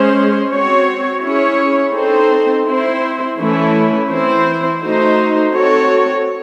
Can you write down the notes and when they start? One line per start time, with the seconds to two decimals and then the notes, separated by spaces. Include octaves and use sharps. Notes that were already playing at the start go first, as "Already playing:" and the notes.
Already playing: G#3 C#4 G#4 C5
0.49 C4 F#4 C#5
1.22 C#4 E4 G#4 C#5
1.93 C4 D#4 A4 C5
2.65 C4 E4 C5
3.38 E3 A3 C#4 E4 A4
4.09 E3 C4 E4 C5
4.81 A3 D#4 F#4 C5
5.53 C4 F#4 A4 C#5